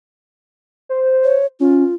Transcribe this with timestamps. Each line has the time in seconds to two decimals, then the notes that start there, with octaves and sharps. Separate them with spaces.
0.89 C5
1.24 C#5
1.60 C#4 F4